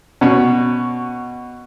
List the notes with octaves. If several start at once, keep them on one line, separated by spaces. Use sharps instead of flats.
B2 C#4